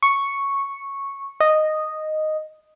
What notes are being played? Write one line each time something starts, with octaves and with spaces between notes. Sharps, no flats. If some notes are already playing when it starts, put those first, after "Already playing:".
C#6
D#5